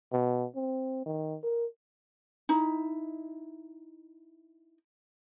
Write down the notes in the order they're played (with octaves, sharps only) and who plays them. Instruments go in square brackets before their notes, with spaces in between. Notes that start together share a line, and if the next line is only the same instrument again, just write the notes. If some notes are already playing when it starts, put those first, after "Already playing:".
[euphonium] B2
C4
D#3
A#4
[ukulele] D#4 E4